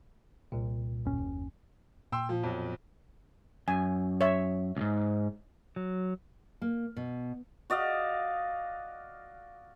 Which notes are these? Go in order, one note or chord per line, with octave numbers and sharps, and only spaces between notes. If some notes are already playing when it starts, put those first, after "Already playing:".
C2 A#2
F#1 D#2 C#4
A#2 G5 C6 E6
F3
B1 F2
F#2 G#5
C#5 E5
C#2 G#2
F#3
A#3
B2
F#4 D5 D#5 F5